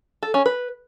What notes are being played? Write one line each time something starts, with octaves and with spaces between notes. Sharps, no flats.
A4
C#4
B4